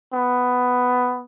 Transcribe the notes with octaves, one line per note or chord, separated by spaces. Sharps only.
B3